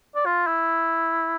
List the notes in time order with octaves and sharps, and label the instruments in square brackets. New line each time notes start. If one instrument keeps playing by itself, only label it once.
[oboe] D5
F4
E4